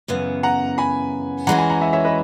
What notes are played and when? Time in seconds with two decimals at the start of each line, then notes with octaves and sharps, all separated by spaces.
0.08 F#2 C#3 E3 B3
0.43 F#5 A#5
0.78 G#5 B5
1.47 E3 G#3 C#4 F#4 F#5 A#5
1.58 G#5 B5
1.70 F#5 A#5
1.81 E5 G#5
1.93 C#5 E5
2.05 B4 D#5